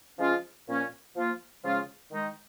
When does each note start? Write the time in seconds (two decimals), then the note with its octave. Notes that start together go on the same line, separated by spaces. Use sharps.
0.17 F3 G#3 C#4 F4
0.66 A#2 F3 A#3 C#4
1.14 F3 A#3 F4
1.62 C#3 F3 G#3 C#4 F4
2.10 D#3 G#3 D#4